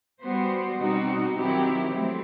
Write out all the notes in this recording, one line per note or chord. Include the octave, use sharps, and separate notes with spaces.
G3 B3 F#4 C5
B2 G3 C4 D#4 F#4
D#3 F#3 C4 E4 G4
F#3 A3 C4